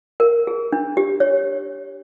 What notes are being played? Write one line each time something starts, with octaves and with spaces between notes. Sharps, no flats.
A#4
G#4
D4
G4
C#5